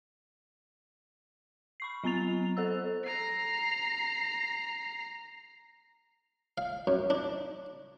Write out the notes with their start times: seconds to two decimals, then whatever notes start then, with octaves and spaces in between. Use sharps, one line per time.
1.80 B5 C#6 C7
2.04 F#3 B3 A#5 A6 F7
2.57 A4 C5 E6
3.05 A#5 C7
6.58 F5
6.87 F#2
7.10 D4